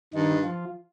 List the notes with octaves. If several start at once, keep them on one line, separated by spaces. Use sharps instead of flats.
G2 D#3 D#4
F3 F4